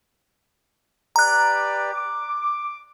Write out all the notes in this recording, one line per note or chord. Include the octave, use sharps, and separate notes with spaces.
G4 B4 D5 A#5 F#6
D6